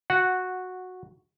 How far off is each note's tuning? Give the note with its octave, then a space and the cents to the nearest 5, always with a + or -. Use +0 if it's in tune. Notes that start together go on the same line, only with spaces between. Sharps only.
F#4 -10 F#5 +0